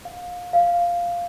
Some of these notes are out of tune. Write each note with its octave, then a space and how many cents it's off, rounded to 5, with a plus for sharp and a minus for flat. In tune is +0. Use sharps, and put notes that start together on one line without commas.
F5 +30
F5 -5